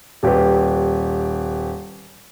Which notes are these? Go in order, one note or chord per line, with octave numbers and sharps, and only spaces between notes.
D#1 G4 B4